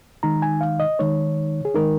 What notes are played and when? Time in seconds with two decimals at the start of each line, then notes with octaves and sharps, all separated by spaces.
0.23 D#3 G#3 D#4 A#5
0.42 G#5
0.61 F5
0.80 D#5
0.99 D#3 G#3 D#4 C#5
1.65 G#4
1.74 D#3 G#3 D#4 A#4